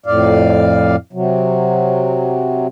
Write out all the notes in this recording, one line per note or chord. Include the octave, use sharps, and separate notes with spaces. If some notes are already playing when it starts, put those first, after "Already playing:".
F2 A2 D5 F5
C3 F#3